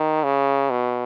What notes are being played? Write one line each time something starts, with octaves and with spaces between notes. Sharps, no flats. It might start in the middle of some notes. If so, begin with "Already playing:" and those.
Already playing: D#3
C#3
B2